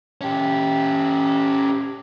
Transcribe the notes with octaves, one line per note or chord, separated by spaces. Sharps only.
C#4 G4